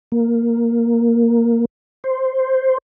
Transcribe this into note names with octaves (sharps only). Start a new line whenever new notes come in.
A#3
C5